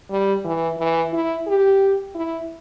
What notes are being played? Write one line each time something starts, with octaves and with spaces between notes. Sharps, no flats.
G3
E3
E3
E4
G4
E4